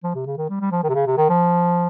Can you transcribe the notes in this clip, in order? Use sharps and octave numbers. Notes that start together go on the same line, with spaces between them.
F3
C3
C#3
D#3
G3
G3
F3
D#3
C3
C#3
C3
D#3
F3